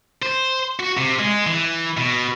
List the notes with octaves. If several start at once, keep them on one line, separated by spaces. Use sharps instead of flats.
C5
F#4
C3
G#3
E3
B2